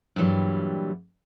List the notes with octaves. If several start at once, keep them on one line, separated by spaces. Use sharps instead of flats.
G2 A#2 E3 F#3 G3